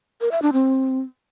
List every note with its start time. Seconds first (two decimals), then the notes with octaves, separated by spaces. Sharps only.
0.21 A#4
0.32 E5
0.42 D4
0.53 C4